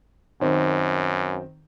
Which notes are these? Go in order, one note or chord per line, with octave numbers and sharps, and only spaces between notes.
F#2 D#3 C4